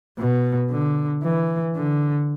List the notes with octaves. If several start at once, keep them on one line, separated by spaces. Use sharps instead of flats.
B2
D3
E3
D3